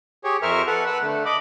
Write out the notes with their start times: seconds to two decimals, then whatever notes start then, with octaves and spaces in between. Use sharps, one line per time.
0.24 G4 G#4 C#5
0.42 F2 A#4 C5 E5 C#6 F6
0.67 A4 B4 F#5
0.87 B4 F#5 E6
1.02 D3 A3
1.25 D#5 B5 D6